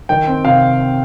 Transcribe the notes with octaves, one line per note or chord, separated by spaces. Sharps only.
D#3 G5
C4
C3 F5